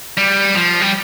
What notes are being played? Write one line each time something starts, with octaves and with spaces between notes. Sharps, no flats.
G3
F3
G3